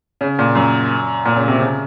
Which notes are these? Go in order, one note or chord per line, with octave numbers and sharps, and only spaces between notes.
C#3
A#2
F#2
A#2
C#3
C3
C#3